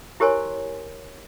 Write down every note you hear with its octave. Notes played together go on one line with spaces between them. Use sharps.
E4 G4 A#4 C#5 G#5 C6